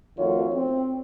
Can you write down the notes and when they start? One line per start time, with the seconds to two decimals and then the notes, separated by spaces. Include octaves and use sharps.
0.18 F2 D#3 A3 F4 F#4 C#5
0.54 C4